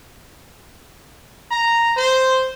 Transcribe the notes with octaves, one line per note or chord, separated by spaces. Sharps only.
A#5
C5